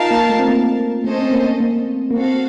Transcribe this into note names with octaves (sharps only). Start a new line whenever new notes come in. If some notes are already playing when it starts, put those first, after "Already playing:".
Already playing: D#4 F4 A#4 F5 A5
A#3
A3
C4
A#3
A3 C#4 A4 C5 D#5
C4
A#3
A#3
A#3
C4 F#4 A4 C5 F5